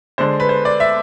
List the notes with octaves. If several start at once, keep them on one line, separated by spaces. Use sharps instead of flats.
D3 G#3 D4 C5
B4
C5
D5
E5